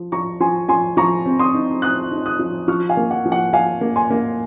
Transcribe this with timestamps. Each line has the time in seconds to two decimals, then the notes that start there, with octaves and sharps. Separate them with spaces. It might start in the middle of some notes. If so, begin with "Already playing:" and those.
Already playing: F3
0.12 F3 A#5 C#6
0.40 F3 G#5 C6
0.69 F3 G#5 C6
0.97 F3 A#5 C#6
1.26 C4
1.39 C6 D#6
1.54 D#4
1.82 C4 D#6 F#6
2.11 D#4
2.26 D#6 F#6
2.39 F3
2.68 F3 C#6 F6
2.89 F5 G#5
2.97 A#3
3.11 F#5
3.25 F3
3.32 F#5
3.53 F3 F5 G#5
3.81 A#3
3.96 G#5 C6
4.10 A#3